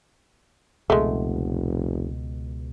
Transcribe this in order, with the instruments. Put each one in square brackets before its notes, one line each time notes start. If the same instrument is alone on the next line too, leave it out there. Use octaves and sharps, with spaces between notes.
[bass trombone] F1 [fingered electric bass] C#2 B2 [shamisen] G#3 A3